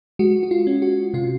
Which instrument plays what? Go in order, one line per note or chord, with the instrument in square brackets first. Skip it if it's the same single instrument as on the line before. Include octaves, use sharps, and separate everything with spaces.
[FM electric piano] G#3 F#4
F#4
F4
C#4
F#4
C3 F4